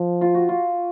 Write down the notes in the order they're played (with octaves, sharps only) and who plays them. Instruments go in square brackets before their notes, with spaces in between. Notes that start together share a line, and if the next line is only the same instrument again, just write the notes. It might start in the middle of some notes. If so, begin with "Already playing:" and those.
Already playing: [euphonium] F3
[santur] F4
F#4
F4